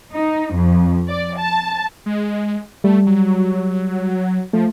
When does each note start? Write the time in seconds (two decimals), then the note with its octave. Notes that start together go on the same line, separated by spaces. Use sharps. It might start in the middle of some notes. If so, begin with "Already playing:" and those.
0.14 D#4
0.55 F2
1.09 D5
1.39 A5
2.06 G#3
2.84 G3 A3
3.07 F#3
4.53 F3 A3